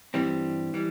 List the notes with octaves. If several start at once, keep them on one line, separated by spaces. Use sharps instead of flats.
G2 E3 G3 C4
E3 G3